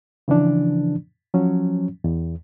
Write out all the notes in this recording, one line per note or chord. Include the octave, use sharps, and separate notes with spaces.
C#3 E3 F3 D4
F3 F#3 C#4
E2